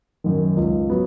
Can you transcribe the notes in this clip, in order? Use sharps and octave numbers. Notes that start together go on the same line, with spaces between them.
F#2 D#3
C#2
F#3 B3